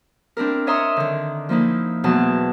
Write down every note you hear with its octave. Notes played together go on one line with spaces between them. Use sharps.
C4 D4 E4 A#4
C#5 D#5 E5 A#5 C6 D#6
D3 D#3
F3 A#3 D#4 E4
E2 B2 F#3 A5